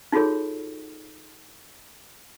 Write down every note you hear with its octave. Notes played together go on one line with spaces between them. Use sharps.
D#4 F4 F#4 G#4 A4 C#5